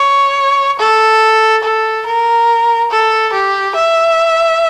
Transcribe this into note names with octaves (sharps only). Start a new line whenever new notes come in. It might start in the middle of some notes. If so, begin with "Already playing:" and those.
Already playing: C#5
A4
A4
A#4
A4
G4
E5